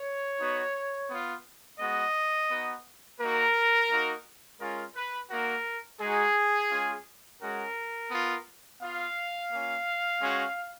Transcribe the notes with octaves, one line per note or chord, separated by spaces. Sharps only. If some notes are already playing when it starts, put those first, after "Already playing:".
Already playing: C#5
B3 D#4 F#4
B3 F4
G#3 B3 F#4 D#5
B3 D#4 F#4
A#3 D#4 F#4 A#4
A#3 D#4 F#4
G#3 C#4 F4 A#4
B4
A#3 D#4 F#4 A#4
G#3 D#4 F#4 G#4
G#3 C#4 F4
G#3 C#4 F#4 A#4
B3 F4
B3 F4 F5
A#3 C#4 F4
G#3 C#4 F#4